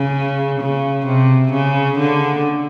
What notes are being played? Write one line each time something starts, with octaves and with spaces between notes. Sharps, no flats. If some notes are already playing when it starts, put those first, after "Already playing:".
Already playing: C#3
C#3
C3
C#3
D3